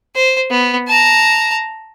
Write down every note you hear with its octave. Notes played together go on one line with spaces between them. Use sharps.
C5
B3
A5 A#5